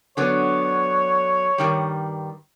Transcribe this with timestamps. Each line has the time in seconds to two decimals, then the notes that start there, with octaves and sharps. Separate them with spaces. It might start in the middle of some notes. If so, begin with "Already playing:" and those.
0.17 D3 F#3 B3 C#5
1.58 G2 D#3 G3